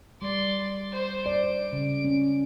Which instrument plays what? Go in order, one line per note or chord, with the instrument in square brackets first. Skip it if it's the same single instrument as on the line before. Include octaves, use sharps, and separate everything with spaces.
[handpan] G3 [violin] D5 C6
[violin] C5
[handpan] D5 [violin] D7
[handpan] C#3
C#4